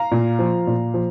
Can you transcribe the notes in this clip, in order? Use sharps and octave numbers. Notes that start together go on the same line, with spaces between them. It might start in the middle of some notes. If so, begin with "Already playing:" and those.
Already playing: F5 A#5
A#2
F3
A#2
F3